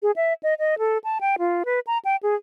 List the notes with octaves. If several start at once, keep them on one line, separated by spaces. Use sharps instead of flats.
G#4
E5
D#5
D#5
A4
A5
G5
F4
B4
A#5
G5
G#4